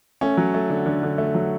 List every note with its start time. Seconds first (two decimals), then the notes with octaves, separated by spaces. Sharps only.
0.21 A3 C#4
0.37 F#3
0.54 A3
0.70 D3
0.86 D3
1.03 D3
1.18 A3
1.34 F#3